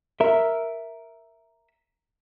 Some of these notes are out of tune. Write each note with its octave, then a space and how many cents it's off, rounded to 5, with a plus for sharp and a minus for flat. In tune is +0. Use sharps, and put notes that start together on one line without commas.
A#4 +0 E5 +0